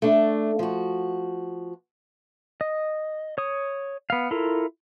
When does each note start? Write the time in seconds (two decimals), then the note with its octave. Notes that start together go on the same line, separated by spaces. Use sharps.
0.02 A3 D4
0.59 F3 F#4
2.61 D#5
3.38 C#5 D#6
4.10 B3 F5
4.31 E4 F4 A4 A#4